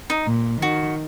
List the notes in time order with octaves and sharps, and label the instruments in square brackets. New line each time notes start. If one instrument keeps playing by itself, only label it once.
[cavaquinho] D#4
[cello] A#2
[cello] D#3 [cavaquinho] F#4